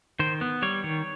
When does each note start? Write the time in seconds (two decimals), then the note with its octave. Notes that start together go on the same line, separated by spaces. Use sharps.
0.19 D#3 C5
0.41 B3
0.62 G3 C#5
0.84 D#3